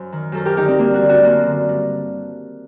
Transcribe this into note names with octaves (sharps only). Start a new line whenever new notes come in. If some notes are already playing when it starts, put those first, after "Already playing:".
Already playing: F#2 C5
D#3
F#2 A4 C5
G4 A#4
D3 D#4 G4
C4 D#4
G2 A#3 D4
D4 F#4
D3
D4 F#4
F#2 A#3 D4
D3
G2